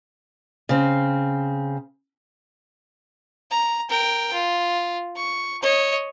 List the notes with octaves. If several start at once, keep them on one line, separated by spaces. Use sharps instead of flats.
C#3 C4
A#5
A#4 G5
F4
C#6
C#5 D#5